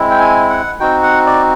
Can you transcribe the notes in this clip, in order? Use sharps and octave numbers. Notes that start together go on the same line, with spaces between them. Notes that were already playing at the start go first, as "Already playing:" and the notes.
Already playing: G#3 C4 E4
G5
G#5
F#5
C4 D#4 F#4 G5
F#5
D5